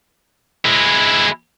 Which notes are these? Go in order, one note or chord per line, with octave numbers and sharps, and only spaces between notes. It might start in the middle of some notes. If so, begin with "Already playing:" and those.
G#3 E4